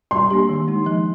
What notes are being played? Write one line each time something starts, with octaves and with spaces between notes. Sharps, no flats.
G3 C6
A#3 D4 G4
D#3
G#3 D#4
F3